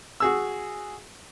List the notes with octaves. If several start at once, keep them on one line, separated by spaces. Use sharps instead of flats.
F#4 G#4 E6